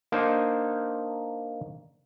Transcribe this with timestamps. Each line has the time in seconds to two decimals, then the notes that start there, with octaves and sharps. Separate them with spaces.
0.12 A#3 D4 D#4 C5